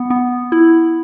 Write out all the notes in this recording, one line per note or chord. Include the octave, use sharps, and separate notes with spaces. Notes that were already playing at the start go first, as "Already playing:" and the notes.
Already playing: B3
B3
E4